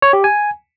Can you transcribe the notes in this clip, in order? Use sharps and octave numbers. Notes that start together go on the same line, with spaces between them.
C#5
G4
G#5